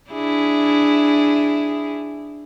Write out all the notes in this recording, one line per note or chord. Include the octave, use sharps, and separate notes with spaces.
D4 E4 G#4